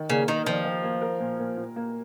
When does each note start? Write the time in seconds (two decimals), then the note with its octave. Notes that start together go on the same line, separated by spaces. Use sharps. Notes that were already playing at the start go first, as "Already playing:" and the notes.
Already playing: D#3
0.10 C#3 A#3
0.28 D#3 D#4
0.46 D#3 F3
0.65 D#3
0.84 A#3
1.02 A#4
1.20 A#2
1.39 A#2
1.58 A#2
1.76 A#3